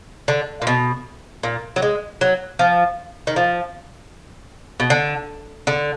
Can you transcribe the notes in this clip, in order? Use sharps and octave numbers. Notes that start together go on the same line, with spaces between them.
D3
A#2
B2
A#2
F#3
G#3
F#3
F3
D#3
F3
B2
D3
D3